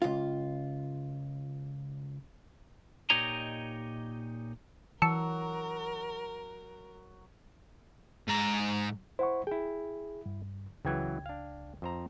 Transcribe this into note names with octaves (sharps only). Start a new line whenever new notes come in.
C#2 F4
A#2 D#4 G4 C#5 D#5 A#5
E3 F#3 A#4 A5 E6 C#7
G#2 A#5
E4 C5 F#5 C#6
E4 G#4 G5
G2
C#2 C#3 E3 F#3 G5 G#6
D4 F5
F2 C5 A#5